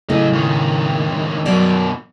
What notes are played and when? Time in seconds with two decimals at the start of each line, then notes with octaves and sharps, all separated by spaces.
0.10 A2 C#3 F#3 D#5
0.33 C#2 D#3
1.46 F#2 B2 F#3 D5